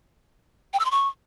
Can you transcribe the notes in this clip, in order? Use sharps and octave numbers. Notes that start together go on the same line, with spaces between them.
G5
E6
C6
C#6